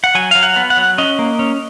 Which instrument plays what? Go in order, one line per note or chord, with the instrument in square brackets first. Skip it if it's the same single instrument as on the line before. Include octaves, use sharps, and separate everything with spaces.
[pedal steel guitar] F#5
F#3 G#5
F#3 F5
F#5
B3
F#5
F#3
C#4 D#5
A#3
C#4